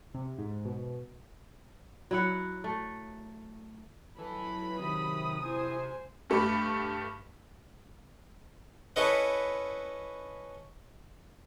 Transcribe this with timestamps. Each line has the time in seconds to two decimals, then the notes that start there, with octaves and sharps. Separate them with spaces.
0.14 C3
0.38 G#2
0.65 B2
2.11 F#3 E4 F#5
2.64 A3
4.18 E3 F#3 A4 B5
4.80 C3 D#3 D#6
5.44 E4 C5 G#5
6.30 G2 A3 G4 B5
8.96 C#4 E4 A4 B4 D#5 F#5